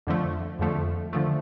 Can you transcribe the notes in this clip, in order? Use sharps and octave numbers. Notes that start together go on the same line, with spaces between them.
F2 D3 F3 A3
F2 D3 F3 A3
D3 F3 A3